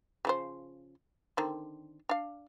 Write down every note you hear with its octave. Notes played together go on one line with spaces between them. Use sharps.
C#3 F3 C5
D3 D#3 C4
D4 F5